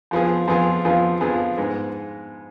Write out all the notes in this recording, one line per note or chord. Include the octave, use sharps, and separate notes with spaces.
F2 F3 B3 F4 G#4
F2 F3 B3 F4 G#4
F2 F3 B3 F4 G#4
F2 F3 B3 F4 G#4
G#2 G#3 B3